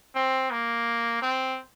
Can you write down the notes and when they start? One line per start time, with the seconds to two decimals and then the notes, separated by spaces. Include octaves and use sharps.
0.15 C4
0.51 A#3
1.22 C4